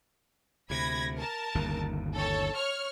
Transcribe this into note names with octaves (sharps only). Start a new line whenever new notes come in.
D2 C3 B5 G#6 A#6
A#4 A5
G1 D#2 C#3
A4 C#5
C#5 C#6 F6